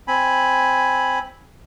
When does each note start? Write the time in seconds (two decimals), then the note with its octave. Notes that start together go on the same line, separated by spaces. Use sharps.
0.08 C4 G#5 B5